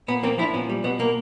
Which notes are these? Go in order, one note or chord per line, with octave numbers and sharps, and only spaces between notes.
A#2 B3
F3 A#3 C4
F3 D4 E4
A#2 B3 C#4
G3
B2 B3
B2 A#3